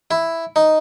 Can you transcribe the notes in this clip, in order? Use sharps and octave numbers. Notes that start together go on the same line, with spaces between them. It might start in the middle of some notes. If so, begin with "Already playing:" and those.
E4
D#4